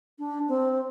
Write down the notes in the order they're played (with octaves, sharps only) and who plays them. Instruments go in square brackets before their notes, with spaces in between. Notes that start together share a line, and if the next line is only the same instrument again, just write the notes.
[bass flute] D4
C4